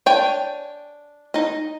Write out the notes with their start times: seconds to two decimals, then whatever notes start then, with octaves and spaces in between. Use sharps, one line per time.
0.06 D4 C#5 G5 G#5
1.34 D#4 D#5